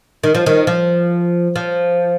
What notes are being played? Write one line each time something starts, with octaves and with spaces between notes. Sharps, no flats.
D#3
F3
D#3
F3
F3